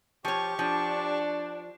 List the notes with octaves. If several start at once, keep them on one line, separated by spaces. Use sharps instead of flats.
F3 G4 C#5 C#6
F3 D4